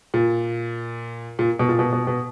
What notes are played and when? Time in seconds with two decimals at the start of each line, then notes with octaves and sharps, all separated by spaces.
0.14 A#2
1.39 A#2
1.59 B2
1.69 A#2
1.79 B2
1.93 B2
2.07 B2